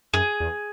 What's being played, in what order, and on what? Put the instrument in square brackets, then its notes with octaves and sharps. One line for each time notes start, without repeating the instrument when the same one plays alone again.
[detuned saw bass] F#2 [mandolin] G#4
[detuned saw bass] E2